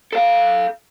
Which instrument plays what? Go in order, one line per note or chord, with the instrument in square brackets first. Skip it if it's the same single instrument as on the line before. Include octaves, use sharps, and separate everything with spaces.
[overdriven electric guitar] A4 F5